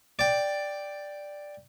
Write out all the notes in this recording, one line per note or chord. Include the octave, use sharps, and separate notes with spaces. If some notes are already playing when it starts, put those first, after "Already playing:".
D5 G5